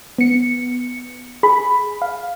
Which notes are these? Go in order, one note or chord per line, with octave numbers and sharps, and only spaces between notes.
B3 C#7
G#4 B5
F5